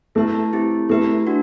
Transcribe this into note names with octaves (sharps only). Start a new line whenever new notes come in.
A3 E4 B4 E5 A5
C4 E4 G4
A3 E4 G4 B4 E5
D4 F#4